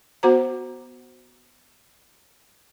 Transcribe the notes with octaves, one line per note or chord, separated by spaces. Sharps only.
B3 F#4 C5 A#5